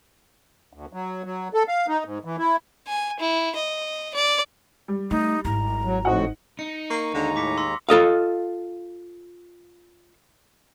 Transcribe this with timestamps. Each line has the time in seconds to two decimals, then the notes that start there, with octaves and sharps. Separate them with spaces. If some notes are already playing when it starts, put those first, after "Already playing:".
0.73 D2
0.93 F#3
1.24 F#3
1.54 A4
1.68 F5
1.88 D#4
2.05 G#2
2.25 E3
2.38 E4
2.87 G#5
3.19 E4
3.55 D#5
4.14 D5
4.88 G3
5.11 A3 D#4
5.45 G#1 E4 A#5
5.84 F#3
6.05 F2 A2 D#4 F#4 C5 F#5
6.59 D#4 C#7
6.90 A#3 C#6
7.14 D#2 D3 G#3 A#5
7.36 A2 D6 B6 C#7
7.58 C6 E6 A#6
7.89 F4 A4 D#5 F5